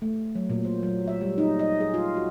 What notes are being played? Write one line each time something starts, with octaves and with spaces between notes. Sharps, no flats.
A3
F#3
A#2
C5
F#3
E5
G3
D#4
D#5
G#4
F4
F#4